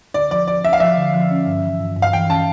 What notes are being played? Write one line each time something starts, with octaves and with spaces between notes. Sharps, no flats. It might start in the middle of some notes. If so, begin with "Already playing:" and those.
D3 D5
F3 D5
F3 D5
C#4 E5
F5
F3 E5
D3
F3
C#4
G2
E3
G2
G2
F5
E3 G5
C#4 A5